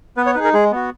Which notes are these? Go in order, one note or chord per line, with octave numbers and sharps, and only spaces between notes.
B3 B4
C#5
D#4 G#4 B4
A#4
G#3 G#4
B3 F#4